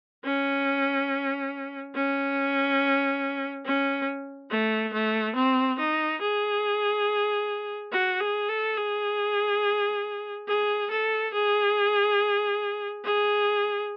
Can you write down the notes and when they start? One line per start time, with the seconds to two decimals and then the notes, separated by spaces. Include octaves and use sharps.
0.24 C#4
1.95 C#4
3.66 C#4
4.50 A3
4.93 A3
5.36 C4
5.79 D#4
6.21 G#4
7.92 F#4
8.20 G#4
8.49 A4
8.77 G#4
10.47 G#4
10.91 A4
11.34 G#4
13.05 G#4